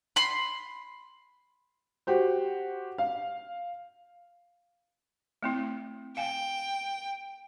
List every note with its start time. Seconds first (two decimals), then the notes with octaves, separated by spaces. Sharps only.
0.16 B5 C6
2.07 F#4 G4 C5
2.98 F5
5.43 A3 C4 E4
6.17 F5 G5 G#5